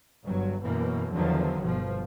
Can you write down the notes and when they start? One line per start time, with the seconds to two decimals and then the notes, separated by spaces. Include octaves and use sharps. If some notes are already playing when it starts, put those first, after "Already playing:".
0.24 G1 G2 F#3
0.62 F#2 B2 E3 A#3
1.13 E2 D3 D#3 F3 F#3
1.61 G1 B2 F3